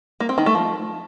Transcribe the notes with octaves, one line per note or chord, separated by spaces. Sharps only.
A#3
C4
D#3
A3
F3